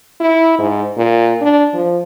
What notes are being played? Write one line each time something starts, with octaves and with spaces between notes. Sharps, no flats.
E4
G#2
A#2
D4
F3